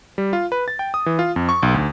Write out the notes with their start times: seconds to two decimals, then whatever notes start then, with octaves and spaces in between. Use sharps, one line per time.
0.18 G3
0.33 F4
0.52 B4
0.68 A6
0.79 G5
0.94 D#6
1.06 E3
1.19 F4
1.36 F2
1.49 C#6
1.63 B1
1.74 D2